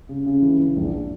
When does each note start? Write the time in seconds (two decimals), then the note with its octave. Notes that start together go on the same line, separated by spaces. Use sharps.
0.09 C#3
0.26 C#3
0.42 E3
0.60 E3
0.76 A#1